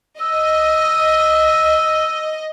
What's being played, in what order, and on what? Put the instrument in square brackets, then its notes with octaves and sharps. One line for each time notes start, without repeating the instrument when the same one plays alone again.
[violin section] D#5 [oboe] E6